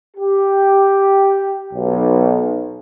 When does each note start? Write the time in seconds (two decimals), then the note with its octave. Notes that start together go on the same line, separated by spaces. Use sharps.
0.17 G4
1.74 B1